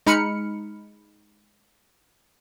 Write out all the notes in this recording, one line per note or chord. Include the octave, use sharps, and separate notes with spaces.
G#3 D#4 B5 F6 C#7